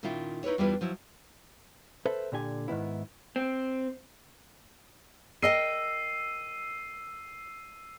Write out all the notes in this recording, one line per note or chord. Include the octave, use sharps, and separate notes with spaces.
A#2 D#3 C#4 E4 F4
D#4 E4 B4 C#5
E2 G3 D4 E4 F4 B4
F3 F#3 E4
A4 B4 C5 E5
A#2 D3 G4 G#5
G#2 D#3 B3 E4
C4
A#4 D#5 G5 E6 C7 D#7